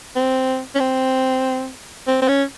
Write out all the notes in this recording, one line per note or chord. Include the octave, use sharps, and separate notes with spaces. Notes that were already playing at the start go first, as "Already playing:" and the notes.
C4
C#4
C4
C4
C4
C#4